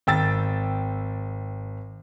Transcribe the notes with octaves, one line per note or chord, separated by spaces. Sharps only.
G#1 G5 E6 A6